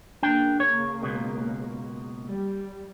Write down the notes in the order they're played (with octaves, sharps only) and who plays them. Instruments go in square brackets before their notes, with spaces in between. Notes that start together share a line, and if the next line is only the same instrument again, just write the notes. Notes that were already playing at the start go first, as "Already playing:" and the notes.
[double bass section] C#3 A#3 [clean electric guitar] D4 G5
[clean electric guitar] C#5
C#2 B2
[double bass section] G3